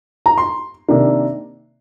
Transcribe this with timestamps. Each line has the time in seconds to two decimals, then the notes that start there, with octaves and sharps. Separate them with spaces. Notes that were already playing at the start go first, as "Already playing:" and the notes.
0.26 A#5
0.38 C6
0.88 C3 D#3 A#3 D4